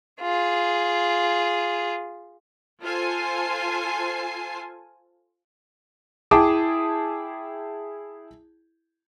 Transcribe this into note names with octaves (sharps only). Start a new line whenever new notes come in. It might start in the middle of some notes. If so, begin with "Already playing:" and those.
F4 G#4
F4 A4 C5 G#5 C7
E4 G#4 G5 A5 D6 D#6